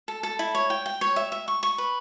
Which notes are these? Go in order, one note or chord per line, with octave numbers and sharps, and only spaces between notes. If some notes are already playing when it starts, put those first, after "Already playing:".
A4
A4
E4
C#5
G5
G5
C#5
E5
E5
C#6
C#6
B4